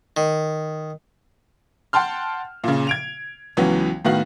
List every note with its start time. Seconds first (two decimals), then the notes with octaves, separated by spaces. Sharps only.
0.17 D#3
1.93 F#5 G5 A5 C6 F6
2.64 A#2 C#3
2.87 G#6 D7 F7
3.57 C#2 E3 F#3 B3 C#4
4.05 A2 D#3 B3 F#4 F5 F#7